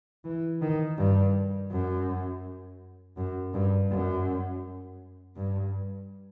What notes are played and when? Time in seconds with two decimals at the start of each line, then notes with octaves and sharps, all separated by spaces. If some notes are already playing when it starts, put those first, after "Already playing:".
0.24 E3
0.61 D#3
0.97 G2
1.71 F#2
3.17 F#2
3.54 G2
3.90 F#2
5.36 G2